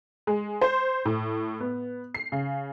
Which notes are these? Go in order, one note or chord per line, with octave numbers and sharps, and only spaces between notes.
G#3
C5
A2
B3
C7
C#3